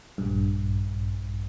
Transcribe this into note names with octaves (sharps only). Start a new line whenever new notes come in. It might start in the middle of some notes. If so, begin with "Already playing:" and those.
A#1 G2